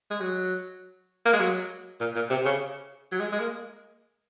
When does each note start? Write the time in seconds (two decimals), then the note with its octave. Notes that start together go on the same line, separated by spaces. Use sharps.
0.11 G#3
0.20 F#3
1.26 A#3
1.33 G#3
1.40 F#3
2.00 A#2
2.16 A#2
2.30 C3
2.45 C#3
3.12 F#3
3.20 G#3
3.32 G#3
3.40 A#3